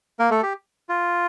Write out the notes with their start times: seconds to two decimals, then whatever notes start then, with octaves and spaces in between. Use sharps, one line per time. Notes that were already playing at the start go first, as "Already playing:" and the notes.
0.19 A#3 A#4
0.30 A3 A4
0.43 G4
0.89 F4